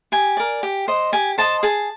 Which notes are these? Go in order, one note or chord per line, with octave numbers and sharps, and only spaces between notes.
G4 G#5
A#4 D5
G4
C5 D#5
G4 G#5
C5 D#5 A5
G#4 A5